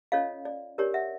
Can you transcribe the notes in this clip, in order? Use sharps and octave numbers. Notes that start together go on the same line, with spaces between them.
C#4 F4 A4 C#5 D#5 F5
D5
D4 G4 A#4 C#5 D5
E5 F#5